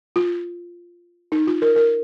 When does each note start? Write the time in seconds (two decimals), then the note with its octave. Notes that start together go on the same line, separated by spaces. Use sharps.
0.16 F4
1.32 D#4
1.47 F4
1.62 A#4
1.76 A#4